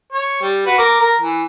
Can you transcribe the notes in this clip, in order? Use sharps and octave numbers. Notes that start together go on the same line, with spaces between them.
C#5
G3
F#4 B4
A#4 D6
A#4
E3